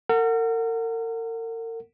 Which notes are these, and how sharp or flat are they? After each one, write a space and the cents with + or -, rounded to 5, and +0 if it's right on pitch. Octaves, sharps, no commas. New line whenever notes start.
A#4 -40 F#5 -5